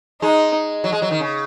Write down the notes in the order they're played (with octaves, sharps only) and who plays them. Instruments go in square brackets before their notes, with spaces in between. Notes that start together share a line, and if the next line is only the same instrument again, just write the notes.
[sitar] G#3 [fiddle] D#4
[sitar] F#3
G#3
F#3
D#3
C#3